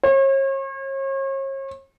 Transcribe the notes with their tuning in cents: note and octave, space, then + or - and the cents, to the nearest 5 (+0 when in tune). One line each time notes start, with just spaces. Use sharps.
C#5 -40